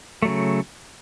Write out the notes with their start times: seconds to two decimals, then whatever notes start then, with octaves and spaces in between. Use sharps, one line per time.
0.22 A3
0.25 F#3
0.28 C#3